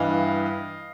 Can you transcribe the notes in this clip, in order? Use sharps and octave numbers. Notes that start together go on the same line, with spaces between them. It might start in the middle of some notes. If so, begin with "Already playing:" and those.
Already playing: G2 E3 D#5 F5